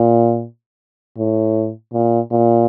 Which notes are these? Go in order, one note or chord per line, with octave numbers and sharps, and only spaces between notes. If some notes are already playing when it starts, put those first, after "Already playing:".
Already playing: A#2
A2
A#2
A#2